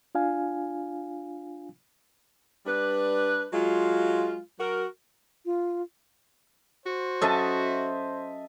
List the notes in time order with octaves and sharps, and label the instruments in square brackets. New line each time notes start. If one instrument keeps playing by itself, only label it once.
[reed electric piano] D4 F4 F5 G#5
[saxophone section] G3 D4 B4
F#3 G#3 F4
F#3 F#4 A#4
[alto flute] F4
[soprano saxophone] F#4 [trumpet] C5
[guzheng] F#3 C#4 A4 [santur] D#5 E5 A5